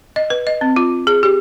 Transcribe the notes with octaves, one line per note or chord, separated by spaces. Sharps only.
D#5
B4
D#5
C4
F4
G#4
G4